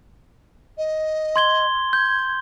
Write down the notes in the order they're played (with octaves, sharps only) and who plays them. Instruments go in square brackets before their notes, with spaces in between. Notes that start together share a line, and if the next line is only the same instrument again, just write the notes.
[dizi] D#5
[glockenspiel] C6 G#6 G7
[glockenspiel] G6 [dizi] G#6